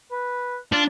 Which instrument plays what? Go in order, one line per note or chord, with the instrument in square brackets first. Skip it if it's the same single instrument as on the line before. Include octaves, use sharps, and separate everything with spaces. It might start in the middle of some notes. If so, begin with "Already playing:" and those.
[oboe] B4
[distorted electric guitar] D4 [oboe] F4